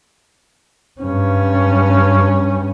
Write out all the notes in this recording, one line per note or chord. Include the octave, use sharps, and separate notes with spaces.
G2 C#4